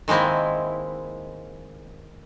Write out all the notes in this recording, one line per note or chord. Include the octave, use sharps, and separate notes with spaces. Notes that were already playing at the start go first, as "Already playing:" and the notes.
D#3 G#3 A#3 C4 E4